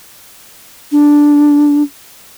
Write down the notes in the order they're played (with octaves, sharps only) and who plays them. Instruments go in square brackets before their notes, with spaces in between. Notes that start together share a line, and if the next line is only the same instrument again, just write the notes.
[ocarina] D4